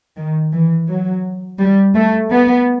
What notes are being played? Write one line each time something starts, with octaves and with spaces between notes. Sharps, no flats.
D#3
E3
F#3
G3
A3
B3